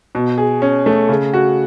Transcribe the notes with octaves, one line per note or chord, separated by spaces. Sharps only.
B2
G#4
C#4
A3
C#3
F#4